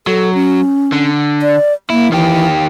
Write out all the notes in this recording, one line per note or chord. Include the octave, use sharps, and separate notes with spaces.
F#3 A4
C#4
D3
D5
A#3 E4
D#3 E3 G4